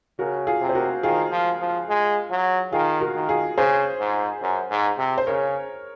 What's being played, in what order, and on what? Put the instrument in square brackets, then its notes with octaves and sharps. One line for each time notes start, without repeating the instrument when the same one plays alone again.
[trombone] C#3 [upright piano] F#4 A#4
[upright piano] F4 G#4
[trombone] C3
[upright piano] C5
F#4 A#4
[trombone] D#3 [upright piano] F4 G#4
[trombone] F3
F3
G#3
F#3
[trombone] D#3 [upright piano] F4 G#4
[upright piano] F#4 A#4
[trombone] D#3
[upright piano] F4 G#4
[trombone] C#3 [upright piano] G#4 C5
[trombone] G#2
F#2
G#2
C3
[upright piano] C5
[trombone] C#3 [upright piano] A#4 C#5